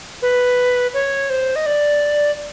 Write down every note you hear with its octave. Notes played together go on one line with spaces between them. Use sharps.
B4
C#5
C5
D#5
D5